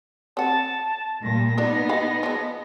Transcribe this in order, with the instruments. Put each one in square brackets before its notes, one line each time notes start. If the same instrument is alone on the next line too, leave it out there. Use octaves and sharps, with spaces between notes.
[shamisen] C4 F#5 [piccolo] A5
[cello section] A#2 G3 [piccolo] A#6
[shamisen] F3 D4 F4 [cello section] B3 D#4
[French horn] D#5 [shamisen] F5 B5
[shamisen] F3 G#3